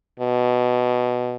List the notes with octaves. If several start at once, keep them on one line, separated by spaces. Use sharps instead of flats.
B2